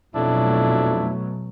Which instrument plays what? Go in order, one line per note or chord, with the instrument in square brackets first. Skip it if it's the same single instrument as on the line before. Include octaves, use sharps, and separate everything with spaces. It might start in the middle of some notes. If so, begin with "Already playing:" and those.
[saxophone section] F2 D4 E4 [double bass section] B2 F#3 A3